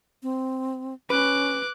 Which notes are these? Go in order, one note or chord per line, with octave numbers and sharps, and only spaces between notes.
C4
C#4 B4 D6 F#6